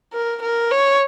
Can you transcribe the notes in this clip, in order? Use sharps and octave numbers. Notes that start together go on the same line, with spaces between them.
A#4
A#4
C#5